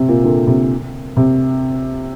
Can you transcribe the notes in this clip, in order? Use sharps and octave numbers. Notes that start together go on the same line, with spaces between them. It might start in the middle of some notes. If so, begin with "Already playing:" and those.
Already playing: C3
A#2
A#2 D3
C3
C3